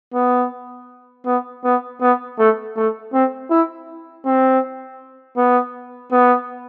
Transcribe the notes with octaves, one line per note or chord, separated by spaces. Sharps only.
B3
B3
B3
B3
A3
A3
C4
E4
C4
B3
B3